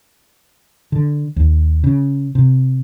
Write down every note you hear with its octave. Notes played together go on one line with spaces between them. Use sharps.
D3
D#2
C#3
C3